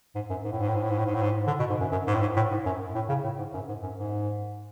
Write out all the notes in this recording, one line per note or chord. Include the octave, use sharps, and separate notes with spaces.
G#2
F#2
G#2
A2
G#2
A2
G#2
A2
G#2
A2
G#2
A2
G#2
D3
B2
G#2
F#2
F#2
G#2
A2
G#2
A2
G#2
F#2
A2
C#3
A2
G#2
F#2
G#2
F#2
G#2